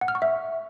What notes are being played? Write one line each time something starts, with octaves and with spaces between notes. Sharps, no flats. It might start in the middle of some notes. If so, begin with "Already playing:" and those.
F#5
F6
C#6
E5